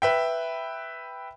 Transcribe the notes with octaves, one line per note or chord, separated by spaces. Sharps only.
B4 E5 G5